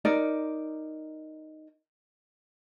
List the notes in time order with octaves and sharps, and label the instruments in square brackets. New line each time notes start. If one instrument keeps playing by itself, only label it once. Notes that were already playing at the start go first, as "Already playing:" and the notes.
[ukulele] D#4 A#4 D5